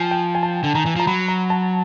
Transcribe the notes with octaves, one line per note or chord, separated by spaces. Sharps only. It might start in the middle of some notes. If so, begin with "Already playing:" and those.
Already playing: F3 G5 G#5
G5
G#5
A5
D3
D#3 A#5
E3
F3 A#5
F#3 B5
A#5
A5